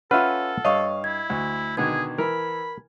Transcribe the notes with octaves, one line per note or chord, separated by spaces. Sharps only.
C#4 F4 A4 B4 E5 F#5 F6
G2 C#5 D#5 F5 C#6
E4 G#6
D2
B2 D3 D#3 G#4 G#6
E3 A#4 B5